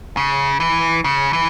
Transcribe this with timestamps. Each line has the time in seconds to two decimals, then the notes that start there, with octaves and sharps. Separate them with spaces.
0.17 C#3
0.60 E3
1.04 C#3
1.33 E3